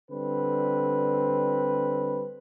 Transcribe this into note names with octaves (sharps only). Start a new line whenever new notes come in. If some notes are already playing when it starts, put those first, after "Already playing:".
D3 G3 C4 B4